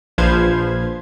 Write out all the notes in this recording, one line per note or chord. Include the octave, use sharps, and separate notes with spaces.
A#1 F3 B4 C5 F5 G#6